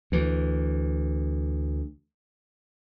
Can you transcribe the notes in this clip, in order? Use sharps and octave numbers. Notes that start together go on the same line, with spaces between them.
D2 E3